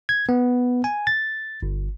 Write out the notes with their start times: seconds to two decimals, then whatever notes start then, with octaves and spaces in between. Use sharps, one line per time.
0.09 G#6
0.29 B3
0.84 G#5
1.07 A6
1.63 G1